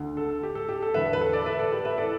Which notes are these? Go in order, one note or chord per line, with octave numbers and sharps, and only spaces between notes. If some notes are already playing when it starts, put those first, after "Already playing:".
Already playing: D2 D3
A4
G4
A4
G4
A4
E2 D3 B4 E5
B4
A4
A4 D5
B4 E5
A4 D5
G4 B4
B4 E5
E3 A4 D5